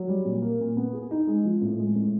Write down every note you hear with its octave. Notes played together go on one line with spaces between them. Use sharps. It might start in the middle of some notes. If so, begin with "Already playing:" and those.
Already playing: F#3
G3
A#2
A#3
A#2
B3
G#4
D#4
G#3
F3
A2
G#3
A2